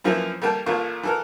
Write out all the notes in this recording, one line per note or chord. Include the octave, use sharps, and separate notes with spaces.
F#2 E3 F3 A#3 E4
G3 A3 A#3 G5 A5
A1 A#2 A3 A#3 F4 C#6
E3 A4 A#4